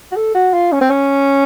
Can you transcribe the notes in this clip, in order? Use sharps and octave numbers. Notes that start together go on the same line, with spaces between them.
F#4
A4
F#4
F4
C#4
C4
C#4